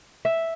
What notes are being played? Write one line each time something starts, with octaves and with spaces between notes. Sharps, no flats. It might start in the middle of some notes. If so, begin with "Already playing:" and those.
E5